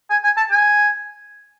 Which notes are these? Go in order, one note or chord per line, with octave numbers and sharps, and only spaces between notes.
G#5
G#5
A5
G#5